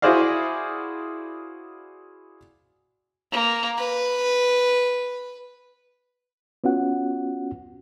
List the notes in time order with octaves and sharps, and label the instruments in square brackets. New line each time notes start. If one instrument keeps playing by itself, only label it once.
[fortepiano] E4 F#4 G#4 C5 D5 F5
[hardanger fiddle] A#3
B4
[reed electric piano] B3 C#4 F4 F#4 F#5